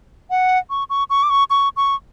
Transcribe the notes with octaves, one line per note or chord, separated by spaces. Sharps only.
F#5
C#6
C#6
C#6
D6
C#6
C#6
C#6